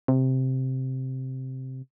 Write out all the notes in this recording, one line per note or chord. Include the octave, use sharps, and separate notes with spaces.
C3